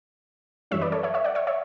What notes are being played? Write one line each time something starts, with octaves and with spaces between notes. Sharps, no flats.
F#2 E3 G3 C#4 C#5 E5
B4 D5
A4 C#5
C#5 E5
C#5 E5
D5 F#5
C#5 E5
C#5 E5